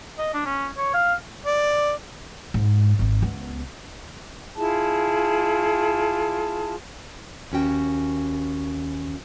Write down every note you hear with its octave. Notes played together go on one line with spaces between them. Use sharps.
D#5
D4
C#4
C#5
F5
D5
G#2
G#1 G#2
C#2 B3
E4 F4 G#4 A5
D#2 C#4 F#4 G5